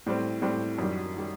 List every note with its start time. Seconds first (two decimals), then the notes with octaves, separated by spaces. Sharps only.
0.06 A2 G3 C4
0.42 A2 G3 C4
0.78 F#2 D#3 G3
1.16 D#3 G3